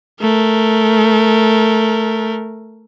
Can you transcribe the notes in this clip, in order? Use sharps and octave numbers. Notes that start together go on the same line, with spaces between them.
A3 A#4